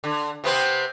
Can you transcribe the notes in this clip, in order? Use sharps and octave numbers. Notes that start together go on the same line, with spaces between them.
D3
C3 B3 C4